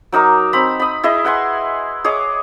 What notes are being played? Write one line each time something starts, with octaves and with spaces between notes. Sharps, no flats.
F#3 D#4 A#4 D6
C4 A#5 B5
B5 D#6
E4 G#4 D#5
B4 F#5 G#5 C6
G#4 C#5 D#5 D6